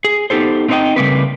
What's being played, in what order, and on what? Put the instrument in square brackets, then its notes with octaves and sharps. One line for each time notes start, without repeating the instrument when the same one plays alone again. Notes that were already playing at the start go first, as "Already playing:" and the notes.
[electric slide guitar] G#4
B3 D#4 G4 A4 C5
A3 C4 D#4 C5 D#5 G5
C#3 G3 A3 A#3 C4 B4